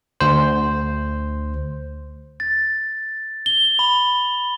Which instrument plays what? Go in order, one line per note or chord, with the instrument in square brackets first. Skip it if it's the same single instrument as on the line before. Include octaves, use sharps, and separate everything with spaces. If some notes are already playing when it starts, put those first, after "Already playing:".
[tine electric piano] D2 C5
[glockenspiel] A6
G7
B5